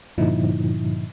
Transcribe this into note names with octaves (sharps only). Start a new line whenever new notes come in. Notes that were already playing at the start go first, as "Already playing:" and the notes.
G2 A#2 D3 F3 D#4 E4